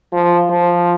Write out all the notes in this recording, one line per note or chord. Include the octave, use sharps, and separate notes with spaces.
F3
F3